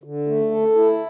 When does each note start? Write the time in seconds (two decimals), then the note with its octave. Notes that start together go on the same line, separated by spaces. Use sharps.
0.04 D3
0.27 A3
0.51 A4
0.75 E4